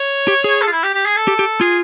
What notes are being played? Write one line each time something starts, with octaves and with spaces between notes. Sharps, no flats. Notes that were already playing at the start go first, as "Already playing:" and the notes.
Already playing: C#5
G4
G#4
A4
F4
E4
G4
G4
G#4
A4
G4
G4
F4 G#4